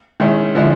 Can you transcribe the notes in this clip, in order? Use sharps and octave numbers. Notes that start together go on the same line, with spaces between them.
D#3 G#3 C#4 E4
D3 F3 G#3 C#4 E4